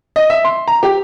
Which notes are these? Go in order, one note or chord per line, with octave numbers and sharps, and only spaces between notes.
D#5
E5
C6
A#5
G4